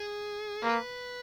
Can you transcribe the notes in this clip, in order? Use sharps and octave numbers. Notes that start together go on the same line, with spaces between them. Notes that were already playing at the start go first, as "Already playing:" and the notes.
Already playing: G#4
A#3 B4